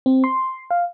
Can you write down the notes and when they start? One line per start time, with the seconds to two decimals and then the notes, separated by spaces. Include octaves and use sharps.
0.06 C4
0.24 C6
0.71 F5